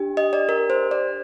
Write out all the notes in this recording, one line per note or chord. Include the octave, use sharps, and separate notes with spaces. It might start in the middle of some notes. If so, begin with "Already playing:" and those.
Already playing: D4 G4
D#5
D5
A#4
C5
D5